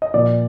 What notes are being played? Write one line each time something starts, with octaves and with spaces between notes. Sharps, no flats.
D#5
A#2 F3 D5